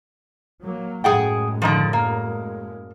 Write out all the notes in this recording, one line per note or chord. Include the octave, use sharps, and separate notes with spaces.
F#3 A#3
F#2 A2 G#3 G#4 F#5 G5
D3 D#3 F3
A#3